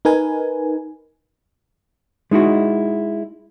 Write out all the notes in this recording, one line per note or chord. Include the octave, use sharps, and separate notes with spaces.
D#4 A#4 B4 G#5
G#3 D#4 E4 F#4